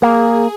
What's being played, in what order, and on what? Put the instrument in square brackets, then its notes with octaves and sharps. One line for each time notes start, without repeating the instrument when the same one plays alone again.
[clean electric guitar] A#3 [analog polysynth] G#4